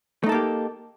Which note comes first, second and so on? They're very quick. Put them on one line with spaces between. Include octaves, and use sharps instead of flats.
A3 D#4 A4 A#3 G4